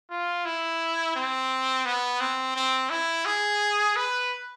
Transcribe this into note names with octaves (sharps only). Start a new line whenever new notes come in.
F4
E4
C4
B3
C4
C4
E4
G#4
B4